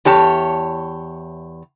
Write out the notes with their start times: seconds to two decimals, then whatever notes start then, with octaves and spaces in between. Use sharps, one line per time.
0.05 E2 G4 C#5 A5